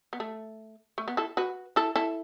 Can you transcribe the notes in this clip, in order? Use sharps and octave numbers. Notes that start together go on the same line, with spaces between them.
B3
A3
A3
B3
E4 A4
F#4 B4
E4 A4
E4 A4